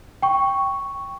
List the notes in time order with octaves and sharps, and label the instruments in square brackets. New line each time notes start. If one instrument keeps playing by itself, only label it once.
[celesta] G5 C#6